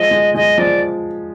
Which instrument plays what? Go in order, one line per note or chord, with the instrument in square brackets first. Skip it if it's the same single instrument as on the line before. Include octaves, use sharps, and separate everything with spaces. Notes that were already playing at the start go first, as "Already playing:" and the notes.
Already playing: [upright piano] F3 G#3 [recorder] D#5
[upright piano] G#3
[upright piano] G#3 [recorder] D#5
[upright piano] F3 [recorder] D5